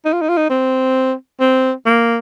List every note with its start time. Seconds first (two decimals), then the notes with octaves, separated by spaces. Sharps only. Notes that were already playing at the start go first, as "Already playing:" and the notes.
0.05 D#4
0.13 F4
0.21 D#4
0.29 F4
0.37 D#4
0.50 C4
1.40 C4
1.86 A#3